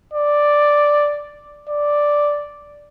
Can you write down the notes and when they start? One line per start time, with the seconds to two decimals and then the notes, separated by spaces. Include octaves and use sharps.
0.13 D5
1.69 D5